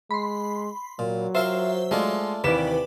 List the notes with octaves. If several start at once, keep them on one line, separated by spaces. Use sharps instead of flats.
G#3 B5 C6
A#2 F#3
F4 A#4 C5 E5 G5
G#3 A3 D4 F4
D#2 C3 E3 G4 B4 D5 E7